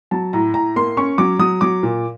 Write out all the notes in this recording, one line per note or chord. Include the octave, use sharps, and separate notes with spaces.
F#3 A5
A2 A#5
A2 A#5
A#3 C6
C#4 C#6
F#3 D6
F#3 D#6
F#3 D6
A#2